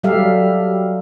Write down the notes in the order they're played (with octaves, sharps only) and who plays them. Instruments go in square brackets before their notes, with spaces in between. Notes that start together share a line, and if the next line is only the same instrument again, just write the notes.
[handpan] F#3 G3 G4 A4 E5 F5